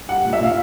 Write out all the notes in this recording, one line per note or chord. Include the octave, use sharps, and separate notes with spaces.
G3 F#5
A#2
E5
A#2 F5